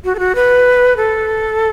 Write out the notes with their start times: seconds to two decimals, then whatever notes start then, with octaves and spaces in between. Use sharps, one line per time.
0.04 F#4
0.15 A4
0.19 F#4
0.35 B4
0.97 A4